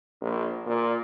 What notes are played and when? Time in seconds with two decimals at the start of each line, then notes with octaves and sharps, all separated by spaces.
0.21 A#1
0.66 A#2